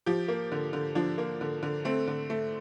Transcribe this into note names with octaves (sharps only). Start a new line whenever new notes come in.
F3 G4
A#3
D3
D3
F3 D4
A#3
D3
D3
A3 C4
D3
A3